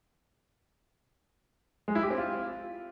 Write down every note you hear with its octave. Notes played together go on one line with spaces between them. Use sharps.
G#3
E4
G4
C4
F4